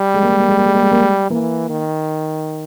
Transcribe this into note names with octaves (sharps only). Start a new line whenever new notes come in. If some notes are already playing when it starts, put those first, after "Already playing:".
Already playing: G3
G#3
A#3
G#3
A#3
G#3
A#3
G#3
A#3
G#3
A#3
G#3
E3 A#3
D#3